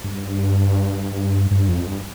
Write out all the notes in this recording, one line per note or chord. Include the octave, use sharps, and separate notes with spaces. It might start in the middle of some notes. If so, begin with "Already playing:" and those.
G2
G2
F2
G2